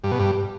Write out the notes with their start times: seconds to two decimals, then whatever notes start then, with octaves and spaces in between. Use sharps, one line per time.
0.04 G2
0.12 B2
0.19 G2